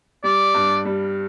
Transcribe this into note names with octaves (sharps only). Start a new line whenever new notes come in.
G3 D5
G2
G3